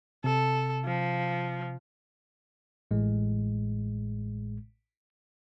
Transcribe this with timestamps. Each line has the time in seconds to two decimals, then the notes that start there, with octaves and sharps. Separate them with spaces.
0.24 C3 A4
0.85 F3
2.91 A1 A2 G#3